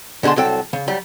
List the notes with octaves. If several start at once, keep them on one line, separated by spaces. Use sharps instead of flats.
B2 D3 G#4 A5 C6
C2 F#3 A4 G5
C#3
F#3 G3